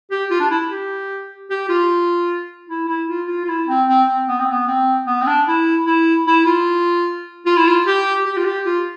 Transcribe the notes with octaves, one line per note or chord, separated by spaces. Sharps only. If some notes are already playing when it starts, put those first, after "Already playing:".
G4
F4
D4
E4
G4
G4
F4
E4
E4
F4
F4
F4
E4
C4
C4
C4
B3
C4
B3
C4
B3
C4
D4
E4
E4
E4
F4
F4
E4
F4
G4
G4
F4
G4
F4